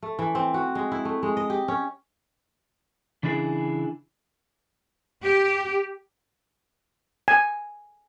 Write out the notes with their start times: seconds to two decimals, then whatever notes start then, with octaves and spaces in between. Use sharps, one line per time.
0.02 A3
0.19 E3
0.35 C4
0.54 F#4
0.75 G#3
0.92 E4
1.05 A3
1.23 G#3
1.37 D#5
1.50 G4
1.68 C#4
3.23 C#3 E3 D4 E4 G#4
5.24 G4
7.28 G#5